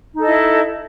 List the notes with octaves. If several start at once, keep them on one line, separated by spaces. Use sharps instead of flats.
D#4 E4 A4 D#5